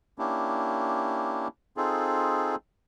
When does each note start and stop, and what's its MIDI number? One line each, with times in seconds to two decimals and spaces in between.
0.19 1.48 58
0.19 1.48 61
0.19 1.48 62
0.19 1.48 64
0.19 1.48 67
1.77 2.56 60
1.77 2.56 63
1.77 2.56 65
1.77 2.56 68
1.77 2.56 69